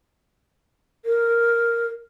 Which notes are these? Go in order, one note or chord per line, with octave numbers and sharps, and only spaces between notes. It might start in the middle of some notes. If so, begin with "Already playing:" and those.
A#4